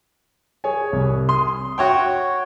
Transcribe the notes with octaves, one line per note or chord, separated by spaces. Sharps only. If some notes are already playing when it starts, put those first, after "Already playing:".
G#4 C#5 G#5
C2
C6 D#6
F#4 C#5 E5 G5